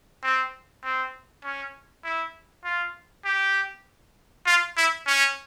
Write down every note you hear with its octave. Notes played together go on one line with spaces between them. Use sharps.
C4
C4
C#4
E4
F4
G4
F4
E4
C#4